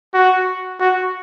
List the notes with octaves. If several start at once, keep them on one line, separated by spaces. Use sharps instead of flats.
F#4
F#4